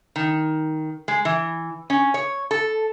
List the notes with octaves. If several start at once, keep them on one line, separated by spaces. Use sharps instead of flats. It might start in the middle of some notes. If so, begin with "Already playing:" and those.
D#3
G#3
E3
C#4
C#5
A4